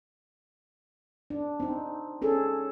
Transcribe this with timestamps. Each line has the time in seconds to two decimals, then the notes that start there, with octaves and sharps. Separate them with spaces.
1.30 D4
1.60 C4 D#4
2.22 C#4 G#4 A4